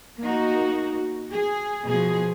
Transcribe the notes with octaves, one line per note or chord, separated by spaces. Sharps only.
A#3 D#4 F#4
G#4
B2 F3 G#4